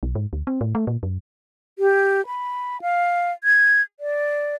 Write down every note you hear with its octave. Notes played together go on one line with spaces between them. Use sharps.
B1
G#2
D2
C4
A2
A3
A#2
F#2
G4
B5
F5
G#6
D5